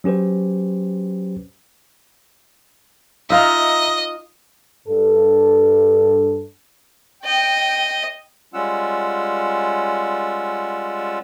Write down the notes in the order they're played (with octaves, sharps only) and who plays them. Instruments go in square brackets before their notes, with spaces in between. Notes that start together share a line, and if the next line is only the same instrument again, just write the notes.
[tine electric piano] F#3 C#4 G4 B4 C5
[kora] D#4 F4 [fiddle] D#5 [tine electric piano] E5 A#5
[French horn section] G2 A4
[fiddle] D#5 [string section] G5
[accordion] G3 G#3 C#4 F4 F#5 E6